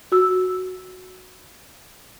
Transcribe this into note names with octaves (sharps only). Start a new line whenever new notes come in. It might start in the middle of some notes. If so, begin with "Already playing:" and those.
F#4 E6